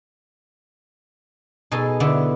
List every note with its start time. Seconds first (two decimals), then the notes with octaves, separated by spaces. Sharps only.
1.71 B2 D#4 G#4 A4
2.00 D3 B3 E4